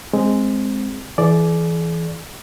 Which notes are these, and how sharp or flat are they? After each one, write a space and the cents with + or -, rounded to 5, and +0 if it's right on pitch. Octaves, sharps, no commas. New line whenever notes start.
G#3 +0 C4 +0
E3 +5 G#4 +40 D5 +0